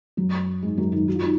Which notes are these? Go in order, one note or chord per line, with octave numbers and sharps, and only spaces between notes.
F#2 F#3
G#2 G#3
F#2 F#3
D#3 D#4
F#4
F4
D#4